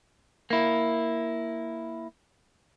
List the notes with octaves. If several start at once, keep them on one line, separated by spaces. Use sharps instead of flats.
A#3 E4